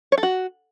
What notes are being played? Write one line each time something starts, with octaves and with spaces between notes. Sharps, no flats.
C#5
A4
F#4